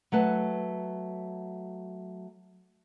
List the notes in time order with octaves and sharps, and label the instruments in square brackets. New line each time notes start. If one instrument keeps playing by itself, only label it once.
[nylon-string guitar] F#3 A3 B4 A5